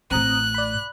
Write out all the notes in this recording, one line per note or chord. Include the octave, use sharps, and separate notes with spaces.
A1 A2 C4 A#5 D#6 F#6
D5 B5